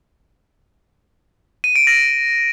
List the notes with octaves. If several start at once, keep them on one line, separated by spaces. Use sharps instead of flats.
D#7
D7
A#6